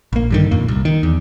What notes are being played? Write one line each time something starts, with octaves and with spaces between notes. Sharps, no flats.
A#1 A#3
G2 D3 D#3
F#1 F2 A#2 A#3
C2
D#3
E2